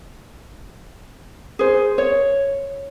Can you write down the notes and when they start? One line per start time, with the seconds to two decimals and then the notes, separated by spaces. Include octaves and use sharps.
1.59 G#4 C5
1.98 C#5